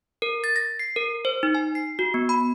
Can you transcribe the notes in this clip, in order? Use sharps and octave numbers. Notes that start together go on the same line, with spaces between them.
A#4
A6
A#6
C7
A#4
C5
D#4
G#5
C7
F#4
B3
B5